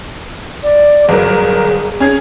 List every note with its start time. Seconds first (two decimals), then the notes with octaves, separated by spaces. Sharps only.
0.63 D5
1.09 G1 F#3 G#4 A#4
2.00 C#4 G#4 G#6